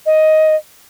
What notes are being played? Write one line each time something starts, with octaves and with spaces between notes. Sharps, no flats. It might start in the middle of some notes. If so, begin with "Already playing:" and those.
D#5